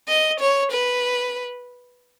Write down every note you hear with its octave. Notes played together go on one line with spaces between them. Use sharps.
D#5
C#5
B4